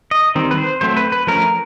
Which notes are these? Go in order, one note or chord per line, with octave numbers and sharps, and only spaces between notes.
D#5
D#3 G3 C4
B4
C5
F#3 A3 C4 C5
B4
B4
F3 A3 C#4 A#4